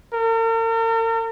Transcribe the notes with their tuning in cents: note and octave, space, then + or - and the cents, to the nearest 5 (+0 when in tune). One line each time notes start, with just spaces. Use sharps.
A#4 -45